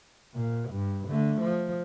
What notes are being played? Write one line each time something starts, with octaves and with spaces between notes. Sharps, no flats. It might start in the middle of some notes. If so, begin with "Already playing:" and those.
A#2
G2
D3 A3
F3